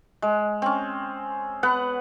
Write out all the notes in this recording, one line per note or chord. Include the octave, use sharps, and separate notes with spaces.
G#3
C4 C#4
B3 B4 F#5